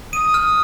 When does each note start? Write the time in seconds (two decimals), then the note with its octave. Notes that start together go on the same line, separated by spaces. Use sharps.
0.13 D#6 D#7
0.34 F6